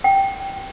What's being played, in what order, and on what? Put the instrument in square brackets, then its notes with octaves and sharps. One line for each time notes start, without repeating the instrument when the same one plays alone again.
[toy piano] G5